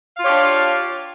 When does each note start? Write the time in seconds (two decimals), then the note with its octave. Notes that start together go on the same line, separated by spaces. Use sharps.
0.16 F5
0.19 F4
0.22 C#5
0.25 G4
0.28 D4